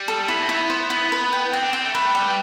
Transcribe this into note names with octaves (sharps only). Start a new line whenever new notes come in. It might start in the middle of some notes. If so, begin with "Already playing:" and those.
Already playing: G3
A4
B3 E4
C4
A3 E4
B3
C5
E4
B4
G5
C4 G5
D4
C4 G5
A3
A3 B4
G3 G5